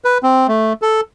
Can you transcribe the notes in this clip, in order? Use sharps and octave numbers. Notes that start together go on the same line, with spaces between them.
B4
C4
A3
A4